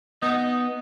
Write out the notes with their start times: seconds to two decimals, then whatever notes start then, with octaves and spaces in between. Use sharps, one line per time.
0.23 B3 D#4